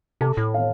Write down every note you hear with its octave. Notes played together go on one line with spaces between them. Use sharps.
C3 A4 A5
A2
F5